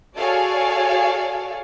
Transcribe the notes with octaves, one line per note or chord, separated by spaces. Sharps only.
F#4 G#4 A4 C#5 D5 F5